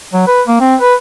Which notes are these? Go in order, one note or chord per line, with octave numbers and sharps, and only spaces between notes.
F#3
B4
A#3
C4
B4